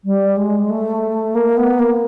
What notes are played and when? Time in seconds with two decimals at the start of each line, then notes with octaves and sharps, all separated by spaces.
0.04 G3
0.37 G#3
0.70 A3
1.35 A#3
1.57 B3
1.79 A#3